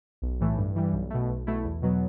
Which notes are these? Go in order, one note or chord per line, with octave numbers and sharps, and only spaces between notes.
B1
A2 E3 A3
G2
E3 G3
B1
B2 A3
B1
B2 A3 E4
E2
B2 F#3 B3